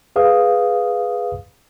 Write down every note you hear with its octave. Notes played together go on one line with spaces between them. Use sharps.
G#4 B4 F5 D#6